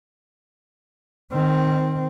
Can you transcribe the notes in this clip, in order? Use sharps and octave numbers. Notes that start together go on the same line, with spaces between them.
D#3 C4